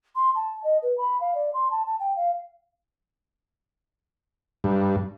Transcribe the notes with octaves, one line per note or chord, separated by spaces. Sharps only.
C6
A5
D#5
B4
B5
F5
D5
C6
A5
A5
G5
F5
G2